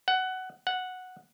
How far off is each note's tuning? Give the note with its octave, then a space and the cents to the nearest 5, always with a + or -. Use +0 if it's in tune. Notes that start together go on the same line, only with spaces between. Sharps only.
F#5 +15
F#5 -5